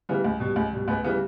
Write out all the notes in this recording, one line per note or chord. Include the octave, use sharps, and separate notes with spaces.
C#3 E3 G3 B3
C#2
B2 G3
C#2
B2 G3
C#2 B3
C#3 E3 G3 B3